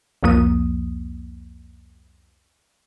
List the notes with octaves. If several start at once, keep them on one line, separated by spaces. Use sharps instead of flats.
C2 F2 F3 A#3 D#6